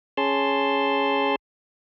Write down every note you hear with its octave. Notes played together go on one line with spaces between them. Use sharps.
C#4 G#4 A5 C6